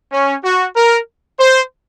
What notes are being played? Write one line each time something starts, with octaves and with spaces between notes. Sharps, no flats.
C#4
F#4
A#4
C5